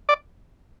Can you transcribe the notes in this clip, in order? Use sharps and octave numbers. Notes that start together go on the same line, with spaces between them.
D5